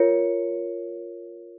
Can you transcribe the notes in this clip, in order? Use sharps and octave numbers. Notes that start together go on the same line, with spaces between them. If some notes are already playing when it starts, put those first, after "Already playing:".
Already playing: F4 A#4 C#5 C#7